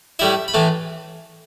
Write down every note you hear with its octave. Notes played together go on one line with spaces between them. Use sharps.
A2 G3 E4 E5
B5
A2 E3 A3 A5